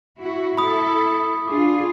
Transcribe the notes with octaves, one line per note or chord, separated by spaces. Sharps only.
E4 F#4
E4 A4 B5 D#6
D4 F4 G#4 D6